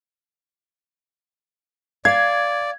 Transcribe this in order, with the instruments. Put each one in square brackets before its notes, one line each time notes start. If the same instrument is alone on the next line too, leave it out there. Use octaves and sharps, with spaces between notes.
[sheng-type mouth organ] D5 [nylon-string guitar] F5 [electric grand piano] G#6